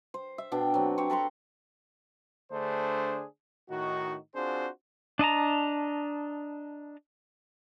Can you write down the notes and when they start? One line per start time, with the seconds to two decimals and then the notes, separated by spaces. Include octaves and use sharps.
0.14 C5
0.38 E5
0.52 B2 D4 G5
0.74 F#3 C4
0.98 G4 C5 C#5
1.10 A4 B4 A#5 C6
2.52 D3 A3 D4 G#4 C5
3.70 A2 D#3 D#4 F#4
4.35 C4 D4 F4 F#4 G#4 C5
5.19 D4 D#5 A5 A#5